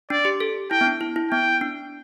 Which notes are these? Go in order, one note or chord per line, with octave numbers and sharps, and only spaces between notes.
D4 D5
G4
A4
E4 G5
B3
D4
E4
E4
B3 G5
D4